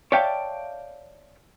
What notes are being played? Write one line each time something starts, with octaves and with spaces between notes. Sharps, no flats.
C#5 D5 E5 F5 G5 A5